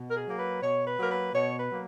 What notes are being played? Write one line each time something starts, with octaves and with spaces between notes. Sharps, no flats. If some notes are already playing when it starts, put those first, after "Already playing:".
Already playing: B2
A#4
G#4
F#3 A#3
B4
B2 C#5
B4
F#3 A#3 A#4
B4
B2 C#5
B4
F#3 A#3